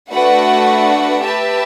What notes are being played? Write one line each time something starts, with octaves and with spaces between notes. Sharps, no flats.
A3 D4 F#4 B4 F#5
G4 B4 E5 A5